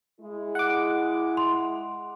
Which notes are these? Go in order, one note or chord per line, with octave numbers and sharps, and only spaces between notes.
G#3 E4
F#5 D6
C6